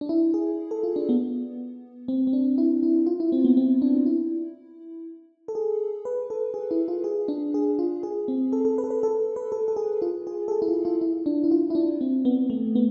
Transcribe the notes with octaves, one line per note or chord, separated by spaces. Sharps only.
D4
E4
G#4
A4
F4
D4
B3
C4
C4
D4
E4
E4
F4
E4
C4
B3
C4
D4
E4
A4
G#4
B4
A4
G#4
E4
F4
G#4
D4
G#4
F4
G#4
C4
A4
A4
B4
A4
B4
A4
B4
A4
A4
G#4
F4
G#4
A4
G#4
E4
F4
F4
E4
D4
E4
F4
E4
D4
C4
B3
A3
B3